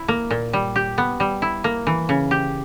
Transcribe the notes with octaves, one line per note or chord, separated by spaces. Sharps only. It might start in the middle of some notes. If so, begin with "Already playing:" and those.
Already playing: E4
A#3
A#2
G3
G4
B3
G3
E4
A#3
E3
C#3
G4